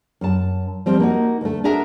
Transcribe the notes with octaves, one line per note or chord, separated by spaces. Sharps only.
F#2 A5
F3 G3 C4
A#3 D#4 F#4
D2 A3
D4 F#4 G#4 A#4 E5